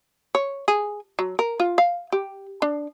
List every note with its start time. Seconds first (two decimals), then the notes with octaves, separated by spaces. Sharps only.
0.35 C#5
0.68 G#4
1.19 F#3
1.39 A#4
1.60 F4
1.78 F5
2.12 G4
2.62 D4